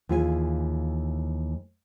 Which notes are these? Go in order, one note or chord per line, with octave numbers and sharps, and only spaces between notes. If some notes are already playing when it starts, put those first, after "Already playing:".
D#2 E3 F4 G#4 A4 G#5